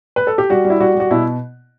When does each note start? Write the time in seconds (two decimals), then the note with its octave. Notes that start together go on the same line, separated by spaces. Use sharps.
0.16 B4
0.27 A4
0.38 G4
0.50 G3 F#4
0.65 G3
0.70 E4
0.80 G3 F#4
0.95 G3
1.00 F#4
1.11 B2 E4